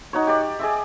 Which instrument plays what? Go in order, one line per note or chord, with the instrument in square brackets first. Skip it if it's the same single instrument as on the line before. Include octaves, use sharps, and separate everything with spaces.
[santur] D#4 F#4 C#5
G4 D5
G#4 D5 E5